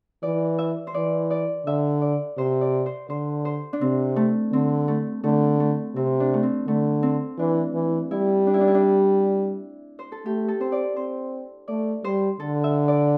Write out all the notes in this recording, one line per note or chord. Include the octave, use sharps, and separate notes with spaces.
E3 D5
E5
C5
E3 D5
D5
D3 E5
D5
C3 C5
D5
C5
D3 C5
C5
D4
C3 C4
A3
D3 C4
A3
D3 A3
A3
C3 C4
D4
A3
C4
D3 A3
C4
E3 D4
E3
G3 E4
D4
E4
D4
E4
D4
C5
A4
A3 G4
A4
C4 C5
D5
C4 C5
A3 D5
G3 C5
D3 A4
E5
D5